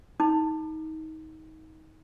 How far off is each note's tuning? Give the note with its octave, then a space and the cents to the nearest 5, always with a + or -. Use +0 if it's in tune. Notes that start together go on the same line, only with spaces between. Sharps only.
D#4 +25 A#5 +0 D6 +35